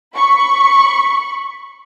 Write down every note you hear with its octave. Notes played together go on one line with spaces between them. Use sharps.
B5 C#6